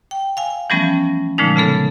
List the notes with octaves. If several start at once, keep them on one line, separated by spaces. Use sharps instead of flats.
G5
F5 G#5
E3 F3 G3 A3 B3 C#4
A#2 D3 F3 G#3 A3 D#4
C#3 A3 B3 A4